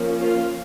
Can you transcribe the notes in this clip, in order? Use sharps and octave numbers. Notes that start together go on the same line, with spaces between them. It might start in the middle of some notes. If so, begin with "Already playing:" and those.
Already playing: F3 A#3 C#4
F4